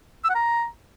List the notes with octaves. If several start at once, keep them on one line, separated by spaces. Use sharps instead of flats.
E6
F#5
A#5